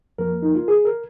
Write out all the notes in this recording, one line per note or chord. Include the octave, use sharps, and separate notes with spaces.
F2 F3 A#3 A#4
D#4
F4
G#4
A#4